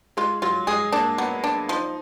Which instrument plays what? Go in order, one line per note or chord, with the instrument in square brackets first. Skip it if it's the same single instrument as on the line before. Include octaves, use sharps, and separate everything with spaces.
[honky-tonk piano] G#3 [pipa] F4
[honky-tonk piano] F#3 [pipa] F4
[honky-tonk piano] G#3 [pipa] G#4
[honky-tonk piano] A#3 [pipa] D4
[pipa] F#3 [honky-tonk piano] B3
[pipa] D4
[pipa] F3 [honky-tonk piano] D#4